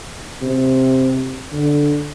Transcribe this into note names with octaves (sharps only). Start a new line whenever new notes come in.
C3
D3